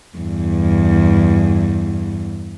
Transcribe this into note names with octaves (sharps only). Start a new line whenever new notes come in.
E2 G2